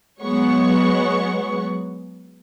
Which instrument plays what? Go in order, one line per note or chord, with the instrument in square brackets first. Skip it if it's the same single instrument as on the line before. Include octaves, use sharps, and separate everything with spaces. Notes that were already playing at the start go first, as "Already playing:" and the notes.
[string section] F#3 G#3 B3 C#5 F#5 C#6